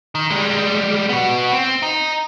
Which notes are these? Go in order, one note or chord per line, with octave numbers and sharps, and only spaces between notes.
D#3
G3 G#3
B3 F#4
C4
D#4